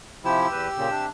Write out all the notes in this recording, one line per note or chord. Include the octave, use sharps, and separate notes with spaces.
C3 F3 E4 G4 E6
E2 B4
A#2 C#3
C3 D4